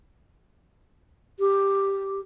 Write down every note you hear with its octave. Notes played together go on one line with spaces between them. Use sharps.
G4